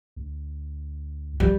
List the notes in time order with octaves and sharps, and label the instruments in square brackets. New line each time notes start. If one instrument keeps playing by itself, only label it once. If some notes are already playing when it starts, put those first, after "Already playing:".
[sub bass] D2
[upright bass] G3